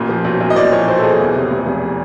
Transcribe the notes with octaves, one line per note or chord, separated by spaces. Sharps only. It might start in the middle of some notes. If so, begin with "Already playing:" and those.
Already playing: A1 A#2
F3
B1
B1
D#5
A#2 D5
F3 C#5
B1 C5
A4
B1 G#4
E2
C3
F1
F1